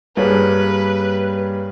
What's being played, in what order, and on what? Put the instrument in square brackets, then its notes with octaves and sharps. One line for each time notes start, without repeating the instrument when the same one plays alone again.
[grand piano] G2 G3 A#3 C#4 G#4 [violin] B4